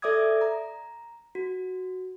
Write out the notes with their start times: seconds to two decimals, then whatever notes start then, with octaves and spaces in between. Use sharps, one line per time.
0.02 A4 D5 E5 D6 D#6 G#6
0.41 A#5
1.35 F#4